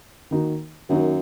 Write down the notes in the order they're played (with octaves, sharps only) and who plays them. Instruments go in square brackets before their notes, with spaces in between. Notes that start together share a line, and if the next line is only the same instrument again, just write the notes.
[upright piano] D#3 A#3 D#4 F#4
[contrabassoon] F#2 [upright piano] D#3 A#3 D#4 F#4